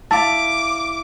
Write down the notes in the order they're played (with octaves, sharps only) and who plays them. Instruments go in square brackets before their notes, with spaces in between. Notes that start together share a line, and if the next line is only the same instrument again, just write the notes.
[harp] E4 F5 [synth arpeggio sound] A5 [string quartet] D6